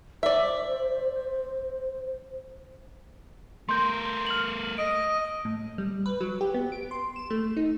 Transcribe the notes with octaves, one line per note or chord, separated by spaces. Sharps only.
C5 D5 E5
A3 A#4 C6 G6
F6 F#7
D#5 D7
A2
G3
B4
F#3
G4
B3
D7
C6
E7
A3
D#4